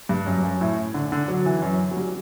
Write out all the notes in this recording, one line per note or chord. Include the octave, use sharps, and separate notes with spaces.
G2
F#2
F#2
A2
D3
D3
F#3
E3
F#2
F#3
G3